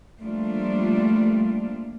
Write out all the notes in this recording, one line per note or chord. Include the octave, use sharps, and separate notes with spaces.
F3 G3 A3 A#3 D4 F4